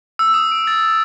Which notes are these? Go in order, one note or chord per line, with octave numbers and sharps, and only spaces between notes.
E6
D#6
D7
A6